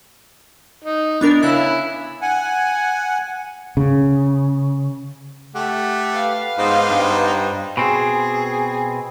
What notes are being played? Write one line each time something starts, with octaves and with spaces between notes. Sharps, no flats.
D#4
B3 D4 A#4
C#3 E4 F#6
F#5 G#5
C#3
A3 G4 F#5
B4 F5
G#2 B3 D#4 F4 C5 A#5 D6
G2
B2 C4 G#4